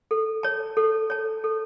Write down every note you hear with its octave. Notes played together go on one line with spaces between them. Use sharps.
A4
C#5 A5
A4
C#5 A5
A4